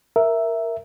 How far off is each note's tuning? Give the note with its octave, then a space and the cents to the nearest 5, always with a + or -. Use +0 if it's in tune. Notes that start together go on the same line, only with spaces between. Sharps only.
A#4 +0 E5 +0